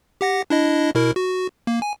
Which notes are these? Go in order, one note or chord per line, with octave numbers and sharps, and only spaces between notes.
G4 F#5 A#6
D4 E4 D#5
B2 E4 A#4
F#4
A#3
G#5